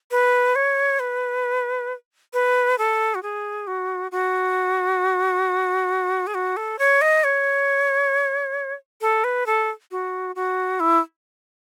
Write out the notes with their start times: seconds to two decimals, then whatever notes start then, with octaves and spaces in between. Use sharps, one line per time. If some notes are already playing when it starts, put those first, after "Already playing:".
0.11 B4
0.55 C#5
0.99 B4
2.33 B4
2.78 A4
3.15 F#4
3.23 G#4
3.67 F#4
4.11 F#4
6.27 G#4
6.34 F#4
6.57 A4
6.79 C#5
7.01 D#5
7.24 C#5
9.01 A4
9.24 B4
9.46 A4
9.91 F#4
10.35 F#4
10.80 E4